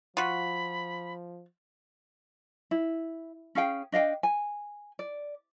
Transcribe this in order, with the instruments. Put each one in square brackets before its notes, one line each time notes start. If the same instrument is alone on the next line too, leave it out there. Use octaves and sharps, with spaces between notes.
[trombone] F3 [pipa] F4 F#4 [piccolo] B5
[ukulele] E4
C#4 G#4 F5 G5
D4 D#5 F5 G5
G#5
D5